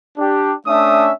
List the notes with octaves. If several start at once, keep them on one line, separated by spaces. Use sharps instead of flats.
D4 G4
A3 C#4 D4 E5 D#6